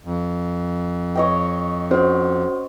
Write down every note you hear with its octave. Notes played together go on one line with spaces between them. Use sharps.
F2
C#5 D#5 G5
C#4 F#4 C5